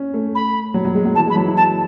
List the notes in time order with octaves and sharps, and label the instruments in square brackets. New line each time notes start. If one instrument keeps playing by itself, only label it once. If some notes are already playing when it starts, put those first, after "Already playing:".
Already playing: [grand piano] C#4
A3
[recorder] B5
[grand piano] F#3
F#3
G#3
F#3
[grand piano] E3 [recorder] A5
[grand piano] G#3 [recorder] B5
[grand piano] F#3
E4
[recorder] A5